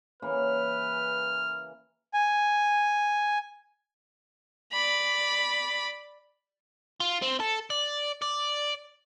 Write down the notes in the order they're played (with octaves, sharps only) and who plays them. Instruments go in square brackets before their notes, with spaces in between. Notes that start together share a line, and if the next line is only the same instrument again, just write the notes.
[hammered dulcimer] C#3 E3 A#3 [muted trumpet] B4 [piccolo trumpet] F6
[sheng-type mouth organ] G#5
[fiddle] D5 B5
[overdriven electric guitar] F4
C4
A4
D5
D5